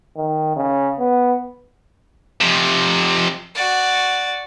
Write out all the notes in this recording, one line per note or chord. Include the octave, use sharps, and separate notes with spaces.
D#3
C#3
B3
F2 C3
F#4 D5